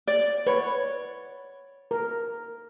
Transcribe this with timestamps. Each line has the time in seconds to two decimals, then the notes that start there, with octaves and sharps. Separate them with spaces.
0.07 D5
0.47 B4 C#5
1.91 A#4